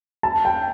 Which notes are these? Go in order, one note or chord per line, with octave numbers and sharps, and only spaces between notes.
A5
G5